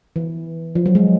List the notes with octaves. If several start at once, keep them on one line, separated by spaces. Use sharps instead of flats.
E3
F3
F#3
G#3